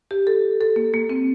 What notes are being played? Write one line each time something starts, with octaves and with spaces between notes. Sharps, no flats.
G4
A4
A4
A#3
A#3
C4